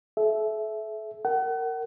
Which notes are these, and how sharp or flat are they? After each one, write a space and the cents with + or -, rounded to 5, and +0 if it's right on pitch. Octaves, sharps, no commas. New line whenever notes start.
A4 -40 E5 +0
A#4 -20 F#5 +35